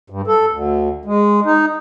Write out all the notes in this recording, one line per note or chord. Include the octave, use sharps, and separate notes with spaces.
G2
A4
D2
G#3
D#4